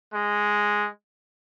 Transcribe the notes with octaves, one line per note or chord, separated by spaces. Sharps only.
G#3